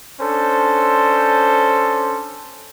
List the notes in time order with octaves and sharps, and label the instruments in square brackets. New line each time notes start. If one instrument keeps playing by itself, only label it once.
[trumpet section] C#4 D4 A4 C5